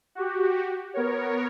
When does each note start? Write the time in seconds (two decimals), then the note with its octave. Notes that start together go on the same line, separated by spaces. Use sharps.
0.15 F#4 G4
0.94 B3 A#4 C#5